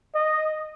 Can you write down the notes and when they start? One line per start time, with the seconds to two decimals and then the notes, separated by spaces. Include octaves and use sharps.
0.14 D#5